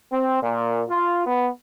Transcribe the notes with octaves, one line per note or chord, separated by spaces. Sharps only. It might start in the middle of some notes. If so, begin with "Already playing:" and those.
C4
A#2
F4
B3